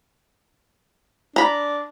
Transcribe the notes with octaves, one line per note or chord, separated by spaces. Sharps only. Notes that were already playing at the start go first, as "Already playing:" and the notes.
D4 A#5 B5